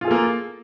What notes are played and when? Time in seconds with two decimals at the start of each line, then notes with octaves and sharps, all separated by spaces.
0.01 F4
0.04 G#4
0.08 A4
0.11 A#3